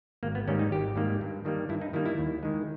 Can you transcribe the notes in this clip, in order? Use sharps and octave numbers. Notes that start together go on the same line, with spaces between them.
G#1 A#3
B3
G#2 D#3 G3 A#3 C#4
D#4
G#1 G4
G#2 D#3 G3 A#3
G2
D#3 G3 A#3
G2 E4
D#4
D#3 G3 A#3 E4
E4
D#2
D#3 G#3